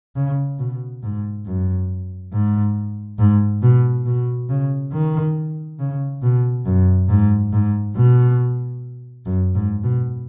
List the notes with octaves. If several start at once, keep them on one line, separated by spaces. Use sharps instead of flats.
C#3
B2
G#2
F#2
G#2
G#2
B2
B2
C#3
D#3
C#3
B2
F#2
G#2
G#2
B2
F#2
G#2
B2